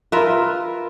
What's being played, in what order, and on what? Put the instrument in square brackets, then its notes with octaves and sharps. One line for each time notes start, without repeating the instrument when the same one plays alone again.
[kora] F4 A#4 B4 E5